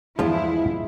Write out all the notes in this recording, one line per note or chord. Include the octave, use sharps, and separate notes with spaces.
E2 G2 F3 G#3 E4 F4